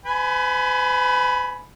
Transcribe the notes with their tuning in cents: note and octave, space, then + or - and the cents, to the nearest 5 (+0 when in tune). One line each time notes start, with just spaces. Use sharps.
B4 +45 G#5 +20 B5 +0